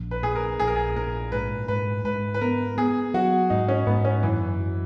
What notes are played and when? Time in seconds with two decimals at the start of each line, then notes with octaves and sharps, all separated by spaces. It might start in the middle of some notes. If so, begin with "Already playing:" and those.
Already playing: A#1
0.11 B4
0.23 A#2 G#4
0.35 A#4
0.60 A#1 G#4
0.67 A#4
0.76 G#4
0.96 A#2 A#4
1.32 G#2 B4
1.68 G#2 B4
2.04 G#2 B4
2.34 B4
2.41 B3 A#4
2.78 B3 G#4
3.14 F#3 F#4
3.50 G#2 D#4
3.68 C#4
3.87 G#2 B3
4.05 C#4
4.23 F#2 E3
4.59 F#3